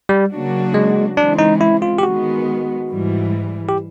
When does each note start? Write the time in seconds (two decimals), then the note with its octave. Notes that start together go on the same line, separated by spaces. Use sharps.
0.09 G3
0.31 C#3 F#3 A#3 D4 F#4
0.74 G#3
1.17 C#3 E3 G#3 C4 D4
1.38 D#4
1.61 E4
1.82 F4
1.98 G4
2.03 D#3 G#3 B3 F#4
2.90 G#2 E3 G3
3.69 G4